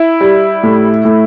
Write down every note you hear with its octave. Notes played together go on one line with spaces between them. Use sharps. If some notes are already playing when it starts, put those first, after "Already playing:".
Already playing: E4
G3
A2
A2